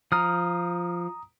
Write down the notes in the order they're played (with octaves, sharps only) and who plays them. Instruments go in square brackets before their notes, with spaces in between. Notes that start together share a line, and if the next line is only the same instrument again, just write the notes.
[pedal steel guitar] F3 F6 [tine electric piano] A#5 D#6